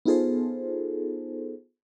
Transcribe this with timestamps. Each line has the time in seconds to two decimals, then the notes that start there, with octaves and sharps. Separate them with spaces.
0.05 B3 D#4 F4 G#4 A4 C5